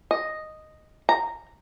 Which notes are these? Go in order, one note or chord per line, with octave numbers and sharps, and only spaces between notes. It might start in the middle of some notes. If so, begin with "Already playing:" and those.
D#5
A#5